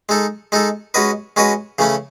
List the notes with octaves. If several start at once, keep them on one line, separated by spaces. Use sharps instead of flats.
G#3 D#4 A4
G#3 D#4 A4
G#3 C#4 F#4 B4 D#5
G#3 C#4 F#4 B4 D#5
C#3 E3 A3 C#4